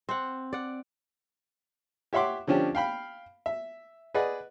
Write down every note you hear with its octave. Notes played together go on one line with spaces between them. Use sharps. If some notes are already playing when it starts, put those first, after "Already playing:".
C4 F#5
D5 F#5
G4 C#5 E5 F#5 C6 D6
D3 F3 C#4 D4 G4
F5 G5 B5 F6
E5
G#4 B4 D5 D#5 F#5